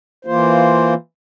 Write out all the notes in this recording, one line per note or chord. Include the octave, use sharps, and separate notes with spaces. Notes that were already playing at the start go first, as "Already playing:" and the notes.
E3 A#3 F4 C5